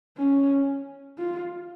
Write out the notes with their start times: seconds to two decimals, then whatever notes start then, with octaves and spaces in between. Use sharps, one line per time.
0.18 C#4
1.19 F4